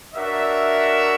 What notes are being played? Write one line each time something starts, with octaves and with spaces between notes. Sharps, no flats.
D4 F#4 A#4 C#5 E5